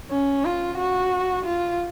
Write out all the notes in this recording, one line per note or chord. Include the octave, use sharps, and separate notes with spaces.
C#4
F4
F#4
F4